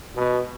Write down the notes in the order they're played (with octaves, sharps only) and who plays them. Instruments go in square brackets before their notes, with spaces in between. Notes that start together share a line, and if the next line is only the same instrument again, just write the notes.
[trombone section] B2